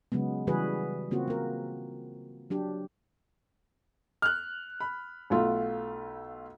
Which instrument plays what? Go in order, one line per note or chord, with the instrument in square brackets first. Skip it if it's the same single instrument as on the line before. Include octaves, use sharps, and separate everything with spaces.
[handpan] C#3 F#3 G#3 B3
C#3 E3 G3 F#4 G#4 B4
C#3 A#3 C4 F4 F#4
A#3 A#4
F#3 D4 G4
[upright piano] F6 F#6
B5
[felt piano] B1 A3 F4